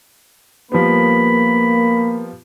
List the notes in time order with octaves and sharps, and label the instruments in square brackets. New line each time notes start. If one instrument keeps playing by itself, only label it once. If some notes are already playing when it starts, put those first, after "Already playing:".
[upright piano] F3 G3 B3 [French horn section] A#3 [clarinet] B5